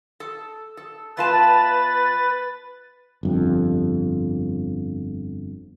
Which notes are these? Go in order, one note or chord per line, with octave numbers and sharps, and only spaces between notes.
A4
A4
E2 F4 B4 A5 A6
G1 F2